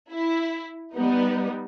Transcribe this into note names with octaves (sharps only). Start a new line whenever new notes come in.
E4
G3 B3 D#4